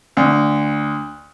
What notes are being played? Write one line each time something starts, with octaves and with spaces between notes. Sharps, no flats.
D2